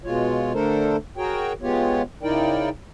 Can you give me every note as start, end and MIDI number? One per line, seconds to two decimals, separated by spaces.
0.04 0.53 47
0.04 0.53 56
0.04 0.53 65
0.04 0.53 73
0.54 0.96 50
0.54 0.96 57
0.54 0.96 62
0.54 0.96 69
0.54 0.96 70
0.54 0.96 72
1.17 1.53 66
1.17 1.53 68
1.17 1.53 70
1.17 1.53 73
1.17 1.53 79
1.62 2.02 56
1.62 2.02 59
1.62 2.02 65
1.62 2.02 67
1.62 2.02 73
2.23 2.69 49
2.23 2.69 63
2.23 2.69 64
2.23 2.69 70
2.23 2.69 74
2.23 2.69 79